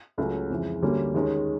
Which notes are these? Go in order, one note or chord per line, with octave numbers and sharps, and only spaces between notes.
C#2 C#3 F#3 A3
F2 C#3 E3 G#3
D2 D3 G3 A#3 C#4
D#2 D#3 G#3 C#4